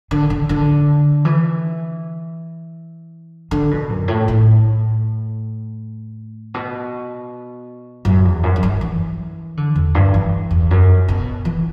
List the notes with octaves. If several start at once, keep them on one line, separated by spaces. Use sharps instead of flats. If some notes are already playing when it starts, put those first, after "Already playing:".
D3
D3
D3
E3
D3
B2
F#2
A2
A2
B2
F#2
E2
F#2
F#2
G2
E3
D3
E2
G2
E3
E2
F#2
B2
E3